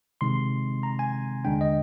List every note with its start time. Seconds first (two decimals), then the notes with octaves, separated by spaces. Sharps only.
0.21 C3 D#3 G#3 C4 D#4 C6
0.83 A#5
0.99 G#5
1.45 D#2 D3 G#3 D4 G5
1.61 D#5